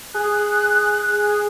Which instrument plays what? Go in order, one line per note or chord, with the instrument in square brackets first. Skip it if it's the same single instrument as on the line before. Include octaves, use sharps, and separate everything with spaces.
[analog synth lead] G#4 [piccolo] F#6